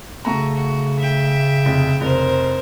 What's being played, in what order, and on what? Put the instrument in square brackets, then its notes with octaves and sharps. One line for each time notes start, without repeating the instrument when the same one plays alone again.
[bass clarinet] C#3 [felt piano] A3 A#5 [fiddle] F#4
[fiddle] F#4
E5 G5
[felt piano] F1
[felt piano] F1 [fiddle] A#4 C5